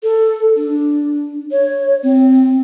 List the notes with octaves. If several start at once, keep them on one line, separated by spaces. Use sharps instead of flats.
A4
D4
C#5
C4